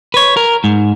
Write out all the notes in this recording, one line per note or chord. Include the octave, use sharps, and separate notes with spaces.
B4 C#5
A#4
G#2